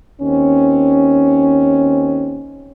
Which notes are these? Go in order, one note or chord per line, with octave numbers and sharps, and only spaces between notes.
D#2 C4 C#4